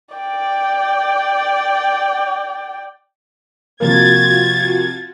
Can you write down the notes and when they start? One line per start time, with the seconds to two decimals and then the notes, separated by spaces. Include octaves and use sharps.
0.15 D5 G5
3.80 C3 F3 A#3 F4 F#4 G#6 A6